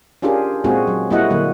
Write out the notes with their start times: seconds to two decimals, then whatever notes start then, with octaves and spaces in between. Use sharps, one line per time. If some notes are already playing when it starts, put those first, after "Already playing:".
0.22 C#4 D4 F4 G4 G#4 A#4
0.64 A#2 G#3 C4 F4 F#4 G#4
0.87 F#3
1.10 G3 A#3 E4 F#4 D#5 F#5
1.30 A#2 D3 F#3 A#3